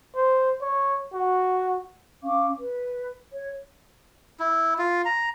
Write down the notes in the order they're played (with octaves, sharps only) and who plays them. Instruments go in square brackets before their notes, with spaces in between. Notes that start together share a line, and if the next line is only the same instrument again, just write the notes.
[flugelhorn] C5
C#5
F#4
[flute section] C#4 F5 C#6 D6
B4
C#5
[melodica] E4
F4
A#5